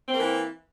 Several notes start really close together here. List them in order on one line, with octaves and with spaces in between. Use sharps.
C4 A#3 E3